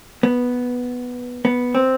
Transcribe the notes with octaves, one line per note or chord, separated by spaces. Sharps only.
B3
B3
C4